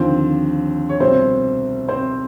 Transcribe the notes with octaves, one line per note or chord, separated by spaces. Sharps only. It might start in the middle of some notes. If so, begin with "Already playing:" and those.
Already playing: D#2 D3 F3 C4 C5
C#5
C2 B2 C4 C5
C4 C5